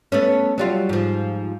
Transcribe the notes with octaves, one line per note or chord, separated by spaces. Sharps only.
A3 B3 C#4
F#3 G3 F4
G#2 F3